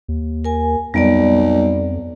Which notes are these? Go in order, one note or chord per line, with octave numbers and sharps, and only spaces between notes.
D#2
A#4 G#5
B1 F2 G3 B3 D5